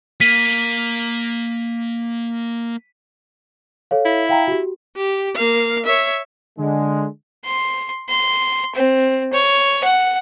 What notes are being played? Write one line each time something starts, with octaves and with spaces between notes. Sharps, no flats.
A#3 B6 D#7
A4 C#5 F5
E4
F5 G5 A#5
F#4 G4
G4
A#3 F5
C#5 E5
D3 G#3
C6
C6
C4
C#5
F#5